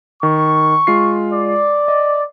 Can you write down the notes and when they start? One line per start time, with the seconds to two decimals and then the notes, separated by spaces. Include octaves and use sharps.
0.23 D#3 C#6
0.87 G#3 F4 C7
1.33 D5
1.88 D#5